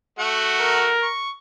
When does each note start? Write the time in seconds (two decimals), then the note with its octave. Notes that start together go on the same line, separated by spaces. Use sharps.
0.19 A3 F#4 F#5
0.61 A#4
1.03 C#6